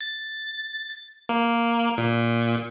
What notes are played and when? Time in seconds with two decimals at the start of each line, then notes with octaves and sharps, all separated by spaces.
0.01 A6
1.29 A#3
1.98 A#2